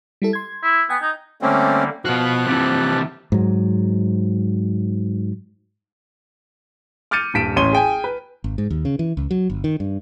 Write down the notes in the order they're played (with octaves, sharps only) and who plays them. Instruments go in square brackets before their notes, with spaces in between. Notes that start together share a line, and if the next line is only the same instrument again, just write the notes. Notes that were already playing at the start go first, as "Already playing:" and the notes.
[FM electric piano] G3 E4 A4
C6 G#6
[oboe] E4
[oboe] B3 [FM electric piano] G5 G#5 G#6
[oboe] D#4
[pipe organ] D3 G3 A#3 [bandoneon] A3 C4 C#4
[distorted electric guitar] B2 F#4 [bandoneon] F3 F#6 [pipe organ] F5
[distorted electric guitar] C3 E3 [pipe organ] G4 A5
[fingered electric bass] G#2 F#3
[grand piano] D6 F6 G6 A6 C#7 D#7
D#1 G2 B6 D7 E7
A1 C#4 C#5 C6 D#7 G7
G#4 G5 G#5
B4
[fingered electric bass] G#1
G#2
D#2
C#3
E3
C#2
F#3
G1
D#3
G2